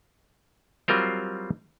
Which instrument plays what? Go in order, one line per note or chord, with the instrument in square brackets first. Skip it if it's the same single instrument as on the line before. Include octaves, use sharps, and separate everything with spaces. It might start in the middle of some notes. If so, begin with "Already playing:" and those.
[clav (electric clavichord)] F#3 G3 C4 F4 A#4 C5